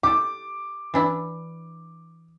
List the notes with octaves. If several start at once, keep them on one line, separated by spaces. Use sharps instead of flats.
G4 A4 D6
E3 D4 E4